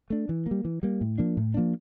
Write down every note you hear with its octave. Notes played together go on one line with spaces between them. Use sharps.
A3 D4
E3
G3 A#3
E3
G3 A#3
A2
F3 A#3 D4
A2
F3 A#3 D4